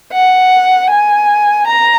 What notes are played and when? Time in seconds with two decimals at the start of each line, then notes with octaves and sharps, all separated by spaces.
0.13 F#5
0.91 G#5
1.68 A#5